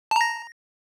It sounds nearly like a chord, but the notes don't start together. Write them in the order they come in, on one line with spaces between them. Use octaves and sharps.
A5 A#5 A#6